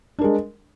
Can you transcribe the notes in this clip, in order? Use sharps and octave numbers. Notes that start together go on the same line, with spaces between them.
G#3 D4 A#4